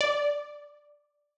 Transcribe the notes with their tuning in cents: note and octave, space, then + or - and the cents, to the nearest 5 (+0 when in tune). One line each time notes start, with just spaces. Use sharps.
D5 +0